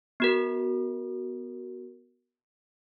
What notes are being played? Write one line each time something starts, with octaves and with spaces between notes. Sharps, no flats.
B3 F#4 A#4